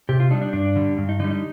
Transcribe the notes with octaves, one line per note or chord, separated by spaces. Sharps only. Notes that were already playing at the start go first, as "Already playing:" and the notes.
C3 G4
F4
G3 D4 D#4
D4
G2 D4
D3 G3
G2
D#4
D3 G3 D#4
D#4